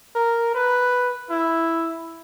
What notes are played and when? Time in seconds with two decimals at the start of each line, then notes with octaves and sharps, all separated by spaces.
0.16 A#4
0.55 B4
1.30 E4